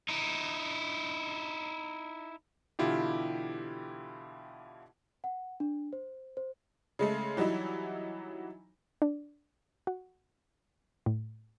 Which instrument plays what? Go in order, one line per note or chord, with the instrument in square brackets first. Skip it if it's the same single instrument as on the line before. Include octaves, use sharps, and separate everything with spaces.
[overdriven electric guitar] D#4 E4
[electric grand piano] B2 D3 E3 E4 F4 G4
[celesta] F#5
D4
C5
C5
[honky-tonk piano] C#3 G#3 A3
E3 F#3 G3 D#4 E4
[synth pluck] D4
F#4
A2